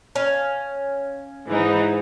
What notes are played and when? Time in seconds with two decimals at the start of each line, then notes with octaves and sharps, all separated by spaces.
0.16 C#4 F5
1.49 G#2 E3 D#4